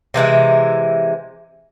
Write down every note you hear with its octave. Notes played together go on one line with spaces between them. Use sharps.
C3 E3 G#3 E5